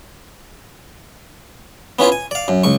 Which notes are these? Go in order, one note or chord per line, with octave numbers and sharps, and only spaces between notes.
B3 C#4 E4 F4
G#5
D5 F5
F#2
C#2 C#6